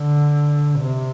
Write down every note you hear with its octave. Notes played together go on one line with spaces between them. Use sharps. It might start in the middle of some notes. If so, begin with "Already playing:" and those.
Already playing: D3
C3